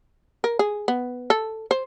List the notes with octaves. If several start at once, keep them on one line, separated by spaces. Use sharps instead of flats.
A#4
G#4
B3
A4
C5